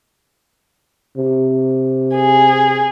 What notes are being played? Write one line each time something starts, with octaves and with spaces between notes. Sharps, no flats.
C3
G#4